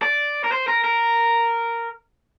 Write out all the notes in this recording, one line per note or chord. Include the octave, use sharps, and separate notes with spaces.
D5
A#4
C5
A#4
A#4